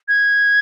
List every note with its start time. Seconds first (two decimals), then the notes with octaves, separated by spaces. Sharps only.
0.08 G#6